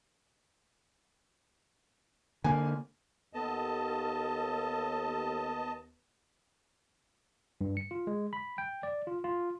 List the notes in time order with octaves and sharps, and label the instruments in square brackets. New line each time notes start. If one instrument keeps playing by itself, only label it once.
[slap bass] D3 A#3 [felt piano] G#5
[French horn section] D#2 [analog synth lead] B3 [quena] A4 [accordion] D#5 A5
[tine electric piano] G2
C#7
F4
G#3
B5
G5
D5
F4
F4